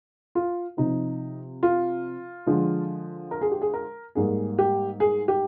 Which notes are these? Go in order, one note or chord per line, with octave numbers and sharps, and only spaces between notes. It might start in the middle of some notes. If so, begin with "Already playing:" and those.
F4
C3 F3 C4 D#4
F4
D3 F3 G#3
A#4
G#4
G4
G#4
A#4
G#2 G3 A#3 G#4
G4
G#4
G4